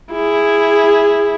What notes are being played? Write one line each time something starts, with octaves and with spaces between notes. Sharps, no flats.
E4 G#4